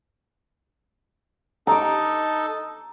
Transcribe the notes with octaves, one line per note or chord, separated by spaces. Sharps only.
D#4 A4 A#5 D6